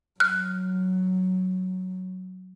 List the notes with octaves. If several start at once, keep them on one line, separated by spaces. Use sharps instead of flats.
F#3 F6 F#6